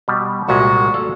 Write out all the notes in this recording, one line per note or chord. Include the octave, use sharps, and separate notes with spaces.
B2 G3
C2 A#2 G#3 F#4
A4 D5 F5